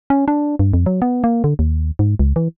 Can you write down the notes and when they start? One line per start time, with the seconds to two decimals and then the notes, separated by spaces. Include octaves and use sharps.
0.10 C#4
0.28 D4
0.59 G2
0.74 F2
0.86 F#3
1.02 B3
1.24 A#3
1.44 D3
1.59 D#2
1.99 G#2
2.19 C#2
2.36 E3